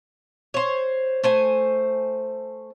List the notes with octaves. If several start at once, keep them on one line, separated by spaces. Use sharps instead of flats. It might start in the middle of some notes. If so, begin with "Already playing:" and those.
C5 C#5
A3 C5 G#5